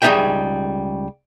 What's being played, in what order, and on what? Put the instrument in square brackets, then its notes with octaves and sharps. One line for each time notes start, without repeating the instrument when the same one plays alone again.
[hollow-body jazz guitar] C#2 G3 D#4 G#4 E5 G5